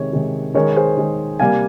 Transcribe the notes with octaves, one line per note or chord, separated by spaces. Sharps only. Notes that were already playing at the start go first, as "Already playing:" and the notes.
Already playing: C3 D#3 G#3 C#5
C3 D#3 G#3
D#3 G#3 A#4 C#5
G#4 C5
D#3 G#3
C3 G3 A#3 F5 G#5